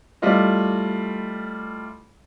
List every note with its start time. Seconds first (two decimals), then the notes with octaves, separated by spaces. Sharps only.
0.22 G3 A3 E4 F4 D#5